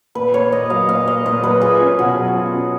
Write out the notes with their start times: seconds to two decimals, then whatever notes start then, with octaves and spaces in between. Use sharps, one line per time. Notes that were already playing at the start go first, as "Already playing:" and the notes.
0.15 A#2 B4
0.34 A#3 C#5
0.52 A#2 D#5
0.70 F#3 F5
0.89 A#2 F5
1.07 A#3 D#5
1.25 A#2 D#5
1.43 F#3 B4
1.61 F4 G#4
1.80 C#4
1.99 B2 F#4
2.17 F#3
2.36 F4
2.54 C#4